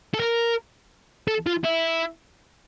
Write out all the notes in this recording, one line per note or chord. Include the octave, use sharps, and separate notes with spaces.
A4
A#4
A4
F4
E4